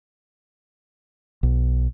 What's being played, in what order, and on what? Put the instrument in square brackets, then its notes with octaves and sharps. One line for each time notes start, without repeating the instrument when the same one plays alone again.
[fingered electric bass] B1